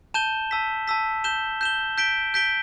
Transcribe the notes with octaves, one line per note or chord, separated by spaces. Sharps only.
A5 G6 E7 G7
A5 E6 B6
A5 E6 B6
G6 E7 G7
G6 E7 G7
G6 B6 D7 G7
G6 B6 D7 G7